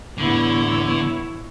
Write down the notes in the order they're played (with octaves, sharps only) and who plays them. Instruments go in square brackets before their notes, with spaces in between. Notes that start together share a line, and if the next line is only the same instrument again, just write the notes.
[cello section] E2 A2 B3 [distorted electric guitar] D3 [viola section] E4 C#5